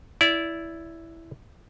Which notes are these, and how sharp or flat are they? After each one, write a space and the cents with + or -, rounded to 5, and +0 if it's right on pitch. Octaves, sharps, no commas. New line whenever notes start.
E4 +0 D5 -25